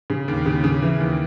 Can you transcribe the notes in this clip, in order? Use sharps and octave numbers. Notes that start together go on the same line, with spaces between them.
C#3
D#2
C#3
C#3
E3
D#2